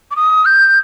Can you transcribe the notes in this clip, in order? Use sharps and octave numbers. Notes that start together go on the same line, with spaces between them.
D6
D#6
G6